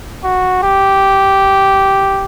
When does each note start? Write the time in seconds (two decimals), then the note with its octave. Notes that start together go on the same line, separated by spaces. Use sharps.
0.24 F#4
0.63 G4